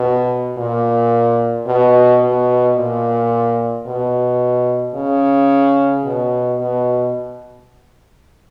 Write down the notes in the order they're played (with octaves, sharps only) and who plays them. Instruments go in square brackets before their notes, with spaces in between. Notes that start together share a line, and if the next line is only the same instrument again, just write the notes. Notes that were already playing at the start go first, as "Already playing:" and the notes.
Already playing: [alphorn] B2
A#2
B2
B2
A#2
B2
C#3
B2
B2